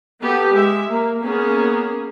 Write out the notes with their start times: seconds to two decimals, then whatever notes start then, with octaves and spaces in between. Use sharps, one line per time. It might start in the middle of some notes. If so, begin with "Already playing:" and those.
0.20 B3 G4 A4
0.52 G#3 E5
0.89 A#3
1.22 A#3 B3 C#4 G#4